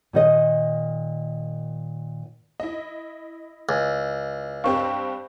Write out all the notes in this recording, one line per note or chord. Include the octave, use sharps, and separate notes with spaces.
A#2 D#3 D#5
E4 D#5
C#2
G2 C4 G4 F5 C#6